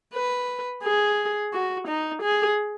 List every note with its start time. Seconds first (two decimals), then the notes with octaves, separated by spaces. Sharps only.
0.14 B4
0.83 G#4
1.53 F#4
1.87 D#4
2.22 G#4